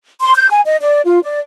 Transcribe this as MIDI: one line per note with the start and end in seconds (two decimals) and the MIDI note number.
0.21 0.33 84
0.35 0.48 91
0.50 0.61 80
0.65 0.76 75
0.81 1.01 74
1.05 1.19 65
1.24 1.39 74